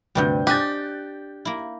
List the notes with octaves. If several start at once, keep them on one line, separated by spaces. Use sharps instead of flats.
D2 G2 C3 G3 B4 G6
D4 G4 D#5 G#5 F#6 G6 A6
A#3 E4